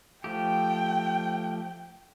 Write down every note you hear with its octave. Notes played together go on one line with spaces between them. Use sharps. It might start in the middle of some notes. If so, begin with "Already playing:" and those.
F3 A3 G4 G5